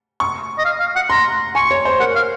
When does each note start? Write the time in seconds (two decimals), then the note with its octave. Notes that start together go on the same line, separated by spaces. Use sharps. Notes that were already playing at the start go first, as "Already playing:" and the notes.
0.20 C#6
0.58 D#5
0.65 F5
0.80 F5
0.96 F#5
1.10 A#5 C6
1.55 G#5 C#6
1.71 C#5
1.85 C5
2.00 A#4 F#5
2.16 F5